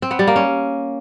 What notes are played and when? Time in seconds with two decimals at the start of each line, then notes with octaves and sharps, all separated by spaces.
0.02 C4
0.11 B3
0.19 G3
0.27 A#3
0.36 C#4